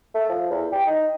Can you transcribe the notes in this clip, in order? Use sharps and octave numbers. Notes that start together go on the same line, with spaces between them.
A3
F3
E2
G4
D#4